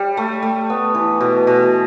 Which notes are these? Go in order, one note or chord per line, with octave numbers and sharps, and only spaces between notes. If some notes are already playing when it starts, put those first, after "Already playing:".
Already playing: G3
A3
A3
B3
E3
B2
B2